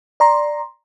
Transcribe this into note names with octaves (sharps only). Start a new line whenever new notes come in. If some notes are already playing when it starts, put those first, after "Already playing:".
D5 A#5 C6